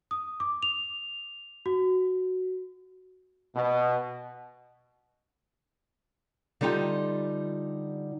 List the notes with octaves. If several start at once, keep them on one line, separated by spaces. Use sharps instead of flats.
D#6
D6
F7
F#4
B2
D3 G3 D#4 F4 G4